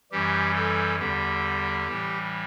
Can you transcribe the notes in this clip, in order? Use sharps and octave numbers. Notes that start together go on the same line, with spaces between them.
F#2 E3 G3 G4
A4
E2 D3 G3 G4
A2 E3 G3